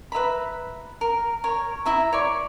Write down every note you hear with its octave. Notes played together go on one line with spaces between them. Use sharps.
B4 E5 A#5 B5
A#4
A#4 C#5
E4 E5 A#5
C#5 D5 C#6